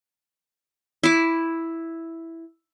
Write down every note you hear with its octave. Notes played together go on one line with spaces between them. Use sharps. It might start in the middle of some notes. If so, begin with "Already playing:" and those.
E4 D6